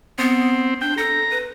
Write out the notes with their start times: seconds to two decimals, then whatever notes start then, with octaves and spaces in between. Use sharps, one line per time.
0.19 B3 C4
0.81 D4 G5
0.97 A4 A#5
1.31 B4